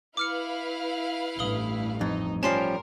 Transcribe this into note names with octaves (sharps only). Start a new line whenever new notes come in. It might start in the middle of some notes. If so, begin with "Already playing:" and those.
E4 B4 F5 D6 F6 C#7
A1 G2 A3 D#6 F#7 G7
F2 D#4
F3 G3 C#4 A#4 A5 C6 C7